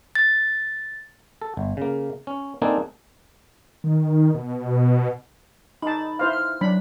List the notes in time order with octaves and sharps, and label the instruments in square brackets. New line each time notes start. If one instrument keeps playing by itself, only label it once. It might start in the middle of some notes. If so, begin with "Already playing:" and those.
[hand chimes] A6
[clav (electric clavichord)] A4
G1
C#3 A#3
C#4
A#3 C4 D4 D#4 A4 G#5
[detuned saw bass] D#3
B2
[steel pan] D#4 A5 [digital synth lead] B5
[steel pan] E4 C5 F5
[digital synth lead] F6
[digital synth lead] F#3 [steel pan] D4 B5